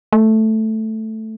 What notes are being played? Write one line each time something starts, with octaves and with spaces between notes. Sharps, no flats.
A3